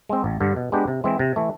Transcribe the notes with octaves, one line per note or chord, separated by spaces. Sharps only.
G#3 C4
A1
G2 D3
B2
G#3 B3 D4 G4
C3
E3 G#3 C4
C3
E3 A3